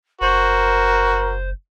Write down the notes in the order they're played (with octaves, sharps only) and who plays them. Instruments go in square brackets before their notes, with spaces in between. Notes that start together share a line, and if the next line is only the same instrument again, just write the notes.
[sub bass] F#1 [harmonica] F#4 [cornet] A#4 [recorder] C5